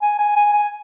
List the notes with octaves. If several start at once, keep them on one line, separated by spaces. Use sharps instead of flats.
G#5
G#5
G#5
G#5